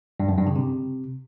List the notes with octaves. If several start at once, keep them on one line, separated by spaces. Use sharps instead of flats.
G2
F#2
G2
C#3
C3